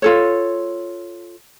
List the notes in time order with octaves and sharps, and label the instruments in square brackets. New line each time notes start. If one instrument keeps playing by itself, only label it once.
[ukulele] F4 A4 C#5